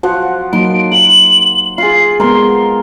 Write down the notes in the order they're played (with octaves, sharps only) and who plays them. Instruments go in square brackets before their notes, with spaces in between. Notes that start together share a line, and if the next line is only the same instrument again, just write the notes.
[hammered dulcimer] F3 [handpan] F#4 C5 F#5
[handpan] F#3 A#3 D#4 [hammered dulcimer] C6 [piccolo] D7
[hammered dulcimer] F#5 [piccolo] F#7
[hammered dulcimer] F4 G#4 [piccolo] C7
[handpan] G#3 B3 [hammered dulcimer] A#4 G#5 [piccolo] C6